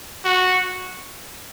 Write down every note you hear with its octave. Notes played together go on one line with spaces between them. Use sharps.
F#4